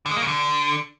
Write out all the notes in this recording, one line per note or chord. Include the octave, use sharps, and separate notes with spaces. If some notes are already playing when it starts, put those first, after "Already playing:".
D3
G#3
A#3
C#3
D3